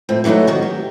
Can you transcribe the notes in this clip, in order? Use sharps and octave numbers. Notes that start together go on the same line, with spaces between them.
F2 A2 C4
E3 F#3 A3 D#4 C#5
D#3 D#4 F#4
G4